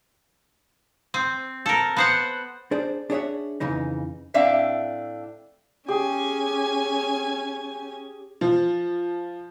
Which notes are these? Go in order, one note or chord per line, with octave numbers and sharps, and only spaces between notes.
C4
A4 A#4
B3 C5 F#5
D4 G#4 C5 D5
D4 G#4 C#5 E5 F#5
F2 C#3 E3 D#4
A2 C4 D4 D5 E5 F5
C#4 G4 G#4 G#5
F3